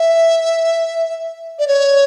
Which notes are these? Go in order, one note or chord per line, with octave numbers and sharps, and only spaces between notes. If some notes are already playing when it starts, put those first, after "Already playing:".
Already playing: E5
D5
C#5